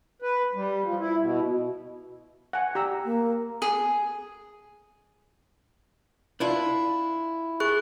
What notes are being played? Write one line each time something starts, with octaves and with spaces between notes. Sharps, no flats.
B4
G3
F3
E4
B2
F#5 G#5
G4 A#5 E6
A#3
G#4
D4 E4 F4
G#4 C#6 F#6